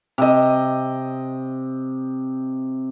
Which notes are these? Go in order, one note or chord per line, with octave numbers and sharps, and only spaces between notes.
C3 D#5